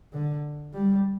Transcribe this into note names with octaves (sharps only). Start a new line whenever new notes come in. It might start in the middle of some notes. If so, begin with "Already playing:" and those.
D3
G3